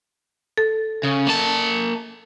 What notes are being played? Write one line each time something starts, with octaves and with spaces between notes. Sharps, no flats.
A4
C#3
A#3 A5